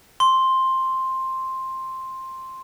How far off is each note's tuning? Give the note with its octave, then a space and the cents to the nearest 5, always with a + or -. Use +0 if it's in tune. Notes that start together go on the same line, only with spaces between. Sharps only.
C6 +5